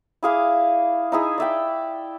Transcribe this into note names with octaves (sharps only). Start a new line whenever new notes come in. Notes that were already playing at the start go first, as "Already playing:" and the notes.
E4 G#4 F5 D6
D#4 E4 G#4
D5 E5 G5